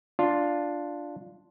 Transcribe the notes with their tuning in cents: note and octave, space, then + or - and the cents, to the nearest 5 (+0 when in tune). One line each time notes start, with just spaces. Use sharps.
D4 +0 F4 +0